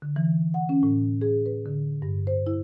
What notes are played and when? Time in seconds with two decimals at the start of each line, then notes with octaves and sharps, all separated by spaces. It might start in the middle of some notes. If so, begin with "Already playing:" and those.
0.02 D3
0.16 E3
0.54 F#5
0.69 C#4
0.83 A2
1.21 G#4
1.46 B4
1.66 D3
2.02 G2
2.27 C5
2.47 E4